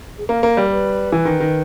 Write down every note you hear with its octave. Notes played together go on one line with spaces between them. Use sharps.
G#4
A#3 A#4
A#3
G3 A#4
B4
E3
D#3
D#3